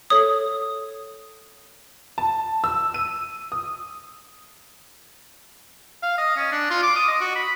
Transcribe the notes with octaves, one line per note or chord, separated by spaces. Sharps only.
A4 C#5 D#6
A5
E6
D#7
D#6
F5
D#5
C#4
D4
F4
D6
D#6
D#5
F#4
B5